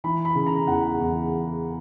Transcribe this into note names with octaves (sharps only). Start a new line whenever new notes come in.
E3 B5
B5
C#3
A#5
E2 F#5
E2